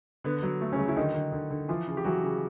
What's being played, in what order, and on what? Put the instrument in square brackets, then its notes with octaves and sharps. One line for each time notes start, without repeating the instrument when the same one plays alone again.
[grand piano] D3 B3
F#3
A3
C#3 C#4
F#3
E4
D3 D#3 D#4
D3
D3
D3
E3 F3 F4
C#3
G4
E3 F#3 F#4
C#3